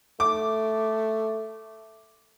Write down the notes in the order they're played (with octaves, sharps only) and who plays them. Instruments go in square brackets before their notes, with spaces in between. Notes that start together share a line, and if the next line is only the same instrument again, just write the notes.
[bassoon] A3 [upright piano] D6